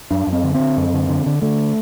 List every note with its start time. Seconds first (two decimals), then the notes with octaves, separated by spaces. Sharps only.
0.11 F#2 D4
0.27 F#2
0.33 C4
0.43 D3
0.54 C4
0.60 D3
0.77 F#2
0.93 D3
1.09 D3
1.26 D3
1.42 D3 A3